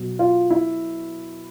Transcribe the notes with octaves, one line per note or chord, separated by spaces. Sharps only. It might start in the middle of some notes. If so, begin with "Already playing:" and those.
Already playing: B2 F#3
F4
E4